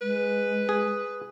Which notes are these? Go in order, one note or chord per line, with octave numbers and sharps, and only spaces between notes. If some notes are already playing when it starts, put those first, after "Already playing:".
G#3 B4
G#4